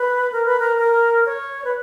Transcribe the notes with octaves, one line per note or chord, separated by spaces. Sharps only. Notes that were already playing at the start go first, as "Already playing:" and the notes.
Already playing: B4
A#4
B4
A#4
A#4
C#5
B4